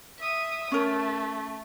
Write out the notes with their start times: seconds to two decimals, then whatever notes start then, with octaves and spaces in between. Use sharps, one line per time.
0.19 E5 D#6
0.72 A3 C#4 A#4